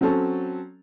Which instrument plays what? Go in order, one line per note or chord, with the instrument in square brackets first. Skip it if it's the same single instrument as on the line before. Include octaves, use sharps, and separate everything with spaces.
[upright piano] F#3 C4 C#4 A4